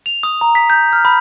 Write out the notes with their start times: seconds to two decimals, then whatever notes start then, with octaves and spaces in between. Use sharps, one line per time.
0.06 F7
0.23 D#6
0.41 A#5
0.55 B6
0.70 G6
0.93 F6
1.05 B5